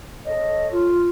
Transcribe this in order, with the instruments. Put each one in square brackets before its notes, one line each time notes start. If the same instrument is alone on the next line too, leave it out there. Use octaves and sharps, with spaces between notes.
[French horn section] A4 C#5 [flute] D#5
[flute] F4